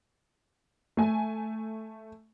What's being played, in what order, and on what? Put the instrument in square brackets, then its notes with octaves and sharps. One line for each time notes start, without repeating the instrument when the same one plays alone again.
[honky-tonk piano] A3 G#5